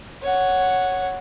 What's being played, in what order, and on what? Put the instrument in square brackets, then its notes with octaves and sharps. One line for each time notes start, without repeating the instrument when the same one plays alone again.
[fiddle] C#5 F#5